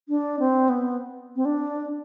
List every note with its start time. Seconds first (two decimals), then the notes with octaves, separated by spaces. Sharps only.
0.09 D4
0.39 C4
0.69 B3
1.36 C4
1.45 D4